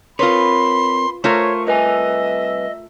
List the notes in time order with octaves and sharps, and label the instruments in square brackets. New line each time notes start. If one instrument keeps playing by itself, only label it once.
[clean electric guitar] C4 A#4 C#5 [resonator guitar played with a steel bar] F4 B4 [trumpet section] B5 [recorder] C6
[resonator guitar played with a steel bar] A3 F4 A#4 [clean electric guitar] C5 [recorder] C#5 [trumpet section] C#6
[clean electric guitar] C2 B4 G#5 [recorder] D#5 [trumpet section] E5